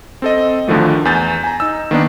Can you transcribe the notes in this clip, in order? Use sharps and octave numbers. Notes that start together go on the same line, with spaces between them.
C4 A4 D#5
D2 D3 D#3 F3 A3
E2 G#5 G6 A6
G#5 A#5
D#4 E6
D#3 A#3 B3 D4